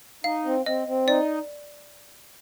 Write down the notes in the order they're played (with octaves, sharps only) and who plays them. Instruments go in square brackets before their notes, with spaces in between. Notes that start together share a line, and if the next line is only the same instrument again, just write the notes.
[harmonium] D#4 [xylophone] F5
[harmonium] C4
[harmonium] C4 [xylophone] D#5
[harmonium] C4
[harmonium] D#4 [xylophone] D5